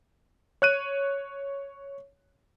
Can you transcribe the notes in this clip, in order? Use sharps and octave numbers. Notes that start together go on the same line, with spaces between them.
C#5 F#6 D#7